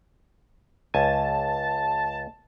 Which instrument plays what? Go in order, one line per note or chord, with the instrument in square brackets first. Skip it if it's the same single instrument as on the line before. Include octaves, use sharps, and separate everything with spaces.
[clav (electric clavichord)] C#2 G#5 [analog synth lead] A5